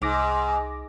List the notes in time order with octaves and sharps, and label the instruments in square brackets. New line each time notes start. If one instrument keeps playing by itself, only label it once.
[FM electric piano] C2 D6 A#6 [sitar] G#2